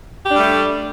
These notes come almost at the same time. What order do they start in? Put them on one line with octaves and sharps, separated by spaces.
G4 D4 G3 A3